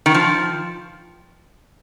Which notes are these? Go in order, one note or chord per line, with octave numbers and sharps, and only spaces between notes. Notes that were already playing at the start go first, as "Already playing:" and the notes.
D#3
F3